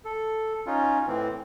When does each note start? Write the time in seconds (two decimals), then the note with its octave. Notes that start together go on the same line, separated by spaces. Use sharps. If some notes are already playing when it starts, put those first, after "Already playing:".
0.05 A4
0.66 C#4 D#4 F4
1.07 A2 E3 C4